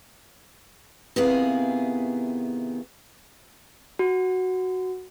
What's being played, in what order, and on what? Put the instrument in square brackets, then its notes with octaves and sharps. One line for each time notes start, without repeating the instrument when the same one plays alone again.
[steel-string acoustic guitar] C3 D#3 B3 E4 G#4 F5
[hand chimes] F#4